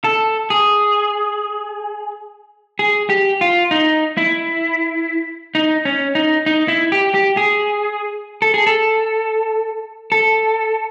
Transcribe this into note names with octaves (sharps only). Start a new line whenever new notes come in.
A4
G#4
G#4
G4
F4
D#4
E4
D#4
C#4
D#4
D#4
E4
G4
G4
G#4
A4
G#4
A4
A4